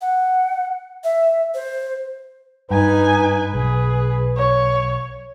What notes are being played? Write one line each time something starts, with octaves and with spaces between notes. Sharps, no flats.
F#5
E5
C5
G2 D#4 B4 G#5
B1 G#4
C#5